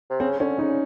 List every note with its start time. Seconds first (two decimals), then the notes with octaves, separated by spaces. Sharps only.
0.10 C3
0.20 C#3 C4
0.40 D3 C#4
0.59 C#3 D#4